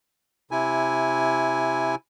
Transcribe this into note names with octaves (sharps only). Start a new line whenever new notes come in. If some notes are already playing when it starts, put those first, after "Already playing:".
C3 E4 G#5